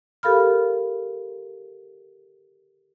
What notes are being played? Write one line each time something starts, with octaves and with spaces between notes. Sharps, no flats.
G4 A4 A#4 F5 B5 F6